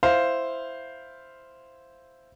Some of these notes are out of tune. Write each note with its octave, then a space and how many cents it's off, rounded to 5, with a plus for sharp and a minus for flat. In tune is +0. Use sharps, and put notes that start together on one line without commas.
E4 +0 C5 +0 F5 +0